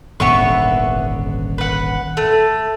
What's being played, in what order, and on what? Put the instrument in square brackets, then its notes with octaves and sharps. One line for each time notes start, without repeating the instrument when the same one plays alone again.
[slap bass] D#1 G#1 D3 [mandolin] B3 E5 C#6
[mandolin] B4 F#5
A3